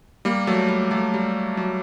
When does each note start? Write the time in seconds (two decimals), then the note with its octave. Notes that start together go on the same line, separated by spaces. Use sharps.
0.25 G3 A#3
0.47 F#3 A3
0.69 G3
0.91 F#3 A3
1.14 G3
1.57 F#3